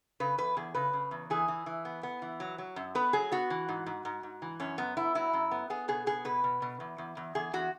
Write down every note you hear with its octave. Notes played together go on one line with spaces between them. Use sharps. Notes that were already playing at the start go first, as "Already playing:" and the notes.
C#3 B4
E2 B4
E2 G#4
C#3 B4
C#3
E2
E3 G#4
E3
E3
B3
B3
E3
F#3
F#3
F#2
B3 B4
F#3 G#4
B3 F#4
E3
G#2
G#2
G#2
G#2
E3
F#2 C#4
F#2 B3
B3 E4
F#3 E4
F#2
B3
B3 G#4
B2 G#4
B3 G#4
B2 B4
B2
B2
E2
E2
E2
E2 G#4
E2 F#4